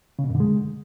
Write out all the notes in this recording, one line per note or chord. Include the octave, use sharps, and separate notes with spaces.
C#3
B2
F#2
D3
G#3